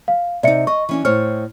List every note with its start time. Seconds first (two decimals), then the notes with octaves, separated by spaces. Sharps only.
0.08 F5
0.43 C3 D#4 D5 E5 C#7
0.67 D#5 C#6
0.89 E3 C#4 D4
1.05 A2 C5 C#5 F6